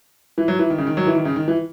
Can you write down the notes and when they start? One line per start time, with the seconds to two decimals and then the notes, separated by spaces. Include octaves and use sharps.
0.38 E3
0.48 F#3
0.59 E3
0.70 D#3
0.78 C#3
0.87 D#3
0.97 F#3
1.07 E3
1.15 D#3
1.25 C#3
1.36 D#3
1.48 E3